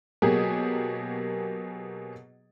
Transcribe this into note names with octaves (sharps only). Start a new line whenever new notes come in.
B2 F#3 A#3 G4 G#4